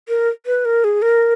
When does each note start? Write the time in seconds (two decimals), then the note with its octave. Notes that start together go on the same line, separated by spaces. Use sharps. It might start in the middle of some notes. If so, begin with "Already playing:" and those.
0.09 A#4
0.46 B4
0.65 A#4
0.84 G#4
1.02 A#4